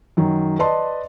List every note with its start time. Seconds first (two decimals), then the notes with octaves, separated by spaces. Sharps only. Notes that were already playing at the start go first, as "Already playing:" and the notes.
0.17 F#2 D#3 F#3
0.59 B4 D5 D#5 A5 C6